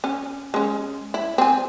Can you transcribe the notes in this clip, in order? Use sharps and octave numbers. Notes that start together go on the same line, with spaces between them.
C#4
G#3 C#4
E4
C4 G#5